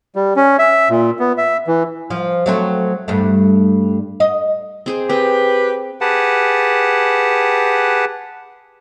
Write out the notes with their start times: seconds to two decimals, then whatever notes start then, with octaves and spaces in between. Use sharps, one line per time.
0.15 G3
0.36 C#4
0.59 E5
0.90 A#2
1.19 B3
1.38 E5
1.67 E3
2.10 F3
2.46 F#3 A3 C4
3.08 G2 A3
4.20 D#5
4.86 C4 G#4 C5
5.10 C4 G4 B4
6.01 G4 G#4 B4 F#5 A5